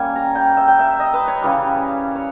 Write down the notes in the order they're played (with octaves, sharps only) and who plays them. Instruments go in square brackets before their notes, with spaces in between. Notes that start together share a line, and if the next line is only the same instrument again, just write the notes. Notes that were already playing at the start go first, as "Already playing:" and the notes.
Already playing: [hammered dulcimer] G3 A#3 C#4 G#5
A#5
G5
E5
G5
E5
D#5
B4
C#5
C#3 E3 G3
C#5